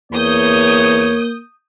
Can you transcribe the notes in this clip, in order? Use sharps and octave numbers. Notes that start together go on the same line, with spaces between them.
E2 A#3 C#5 D#6 G6